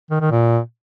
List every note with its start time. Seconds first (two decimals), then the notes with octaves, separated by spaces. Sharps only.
0.10 D#3
0.21 D#3
0.31 A#2